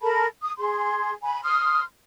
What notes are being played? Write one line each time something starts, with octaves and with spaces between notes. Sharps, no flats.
A4 A#4 A5 B5
D#6
G#4 C6
G#5 B5
C6 D#6 F6